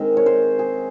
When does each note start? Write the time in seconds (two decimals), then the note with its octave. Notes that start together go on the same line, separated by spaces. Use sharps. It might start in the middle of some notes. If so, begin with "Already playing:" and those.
Already playing: D#3 G#3 C4
0.17 C#5
0.26 C5
0.59 G#4